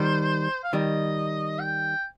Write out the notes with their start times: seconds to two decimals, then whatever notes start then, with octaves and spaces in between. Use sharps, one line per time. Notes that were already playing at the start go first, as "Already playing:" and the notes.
Already playing: D#3 G3 C5
0.64 F5
0.73 D#3 G3 D#5
1.59 G5